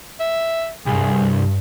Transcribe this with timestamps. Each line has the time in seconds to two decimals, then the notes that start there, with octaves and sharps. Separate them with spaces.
0.20 E5
0.86 C2 G2 G#4